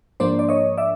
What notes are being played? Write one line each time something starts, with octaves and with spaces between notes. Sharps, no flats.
G#2 F3 A#3 D4 C5 D5
D5
C#5 D#5
D5 E5